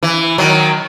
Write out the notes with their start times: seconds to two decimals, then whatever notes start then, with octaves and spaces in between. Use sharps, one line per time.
0.03 E3
0.38 D#3 F#3